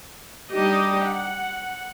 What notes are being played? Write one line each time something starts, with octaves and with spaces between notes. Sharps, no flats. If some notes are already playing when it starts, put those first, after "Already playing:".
G3 D4 D#4 G4 D#5
F#5